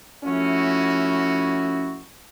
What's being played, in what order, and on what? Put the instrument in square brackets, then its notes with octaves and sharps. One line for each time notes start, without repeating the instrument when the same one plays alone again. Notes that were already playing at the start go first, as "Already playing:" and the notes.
[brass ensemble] F3 A3 C#4 E4 F#4